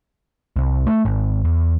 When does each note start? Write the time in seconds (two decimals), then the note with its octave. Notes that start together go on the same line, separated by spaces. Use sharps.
0.56 C2
0.87 A3
1.05 G#1
1.45 E2